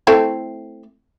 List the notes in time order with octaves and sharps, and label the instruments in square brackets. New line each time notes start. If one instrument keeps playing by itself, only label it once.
[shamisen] A3 C4 E4